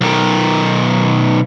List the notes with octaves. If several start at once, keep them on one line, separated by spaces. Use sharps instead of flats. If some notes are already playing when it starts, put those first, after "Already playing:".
B1 D#3